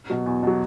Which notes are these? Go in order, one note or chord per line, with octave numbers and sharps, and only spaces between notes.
B2 F#3
E2
B2 F#3